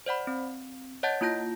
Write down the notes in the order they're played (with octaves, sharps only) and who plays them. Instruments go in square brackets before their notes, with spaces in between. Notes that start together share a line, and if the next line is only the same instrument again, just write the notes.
[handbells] C5 D5 F#5 B5
C4
C#5 D#5 F#5 A5 G6 A6
A#3 E4 F4 A5 G6 A#6